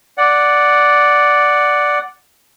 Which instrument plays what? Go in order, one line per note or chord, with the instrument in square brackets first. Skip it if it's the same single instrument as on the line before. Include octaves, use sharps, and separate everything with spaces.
[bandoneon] D5 F#5